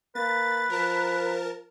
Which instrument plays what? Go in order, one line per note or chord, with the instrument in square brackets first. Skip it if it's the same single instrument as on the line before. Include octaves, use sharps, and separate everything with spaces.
[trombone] A#3 [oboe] B4 [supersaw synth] A6
[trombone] F3 [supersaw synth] A#4 A5